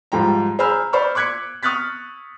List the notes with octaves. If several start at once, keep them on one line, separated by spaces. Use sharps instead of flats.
G#2 F3 G3 G5 A#5
G#4 C5 A#5 B5 E6 F6
C5 D5 B5 C#6 F6
C6 D6 F#6 G#6 B6 C#7
C#6 D#6 F6 F#6 A6 B6